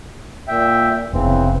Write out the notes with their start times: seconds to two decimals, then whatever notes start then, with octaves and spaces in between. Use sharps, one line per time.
0.48 A#2 E5 G5
1.13 F1 C#3 E3 B3 C4